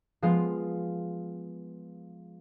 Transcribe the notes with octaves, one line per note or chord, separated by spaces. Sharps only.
F3 G#3 B3 F4 F5